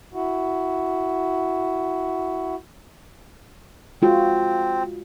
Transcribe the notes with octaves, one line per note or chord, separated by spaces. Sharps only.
E4 F#4
G#3 C4 F4 F#4